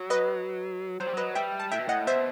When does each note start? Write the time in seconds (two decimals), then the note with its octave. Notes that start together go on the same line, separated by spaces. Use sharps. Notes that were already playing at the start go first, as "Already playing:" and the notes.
Already playing: F#3
0.10 B4 D#5
1.00 F#3 C5
1.07 G3
1.14 F#3 B4 D#5
1.35 G3 E5 G5
1.60 A5
1.71 A2 E5 G5
1.79 B2
1.88 A2 D#5 F#5
2.07 B2 C5 E5